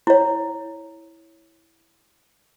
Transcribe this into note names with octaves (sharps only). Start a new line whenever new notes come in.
E4 C#5